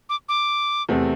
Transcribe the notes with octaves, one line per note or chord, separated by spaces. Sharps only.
D6
D6
E2 C3 A3 C4